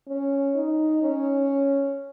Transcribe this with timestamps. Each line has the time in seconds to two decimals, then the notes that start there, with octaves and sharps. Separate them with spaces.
0.08 C#4
0.56 D#4
1.02 C#4